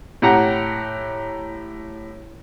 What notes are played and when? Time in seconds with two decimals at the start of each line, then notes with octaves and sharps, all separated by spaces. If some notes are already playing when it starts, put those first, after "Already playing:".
0.22 A2 G4 F#5 A#5